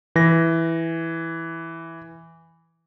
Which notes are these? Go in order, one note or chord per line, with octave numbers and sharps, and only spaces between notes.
E3 A#6